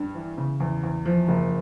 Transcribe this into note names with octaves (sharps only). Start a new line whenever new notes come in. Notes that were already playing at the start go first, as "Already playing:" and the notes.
Already playing: G2
E3
C#3
E2
E2
F3
F#1